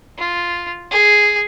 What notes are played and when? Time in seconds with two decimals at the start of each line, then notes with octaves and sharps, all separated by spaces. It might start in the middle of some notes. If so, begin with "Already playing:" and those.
0.18 F4
0.91 G#4